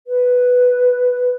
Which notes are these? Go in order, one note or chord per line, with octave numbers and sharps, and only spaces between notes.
B4